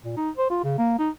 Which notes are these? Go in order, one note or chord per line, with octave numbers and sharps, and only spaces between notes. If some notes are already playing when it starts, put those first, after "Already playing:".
A#2
D#4
C5
F4
C#3
A#3
D#4